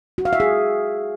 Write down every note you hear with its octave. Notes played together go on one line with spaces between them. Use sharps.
F#4
F5
E5
G#4